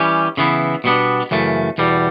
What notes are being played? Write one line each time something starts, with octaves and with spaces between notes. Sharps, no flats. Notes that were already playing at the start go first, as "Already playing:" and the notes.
Already playing: E3 G3 C#4 G4
C#3 E3 B3 E4
B2 G3 B3 D4
F#2 C#3 E3 A3
E2 B2 G3